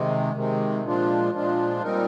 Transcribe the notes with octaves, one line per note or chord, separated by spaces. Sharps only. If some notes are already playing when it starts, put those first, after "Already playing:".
Already playing: C3 D#3 G#3
C3 D#3 G#3
A#2 F3 G#3 D4 F4
A#2 F3 G#3 D4 F4
A#2 G3 C4 D#4 A#4